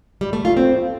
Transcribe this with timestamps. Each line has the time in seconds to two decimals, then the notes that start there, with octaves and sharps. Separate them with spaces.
0.21 G3
0.33 A3
0.45 F4
0.57 C4